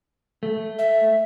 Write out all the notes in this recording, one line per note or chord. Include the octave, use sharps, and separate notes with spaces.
A3
E5